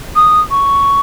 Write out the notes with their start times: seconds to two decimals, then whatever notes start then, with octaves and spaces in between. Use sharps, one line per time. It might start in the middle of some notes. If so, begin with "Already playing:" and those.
0.16 D#6
0.51 C#6